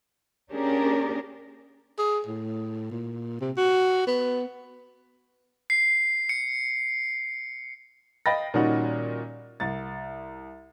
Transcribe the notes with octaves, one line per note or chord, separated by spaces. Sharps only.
A#3 C#4 D4 G4 G#4 A#4
G#4
A2
A#2
C3
F#4
B3
C7
C#7
D#5 F5 G5 B5 A6 A#6
A#2 D#3 G3 C#4 D#4 F#4
C2 A6